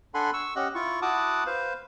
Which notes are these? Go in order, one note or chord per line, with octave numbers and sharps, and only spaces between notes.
D4 A4 F#5 G#5 B5 C6
C#6 E6
C#4 G4 D#5 F#5
E4 F4 C#6
E4 F#4 F#5 A5 D6 D#6
B4 C5 F5